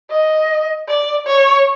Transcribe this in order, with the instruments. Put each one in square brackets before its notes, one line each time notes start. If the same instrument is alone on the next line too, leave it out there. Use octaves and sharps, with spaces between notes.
[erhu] D#5
D5
C#5